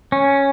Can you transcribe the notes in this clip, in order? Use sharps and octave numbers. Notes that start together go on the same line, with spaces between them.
C#4